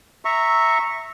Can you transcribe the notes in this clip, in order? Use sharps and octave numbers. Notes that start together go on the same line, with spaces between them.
E5 A#5 C#6